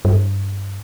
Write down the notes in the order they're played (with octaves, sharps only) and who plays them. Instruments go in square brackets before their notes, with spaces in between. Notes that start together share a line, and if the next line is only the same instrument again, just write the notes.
[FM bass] G2